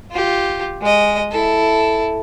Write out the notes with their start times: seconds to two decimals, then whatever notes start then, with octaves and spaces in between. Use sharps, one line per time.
0.11 F4 G4
0.82 G#3 D#5
1.31 E4 A4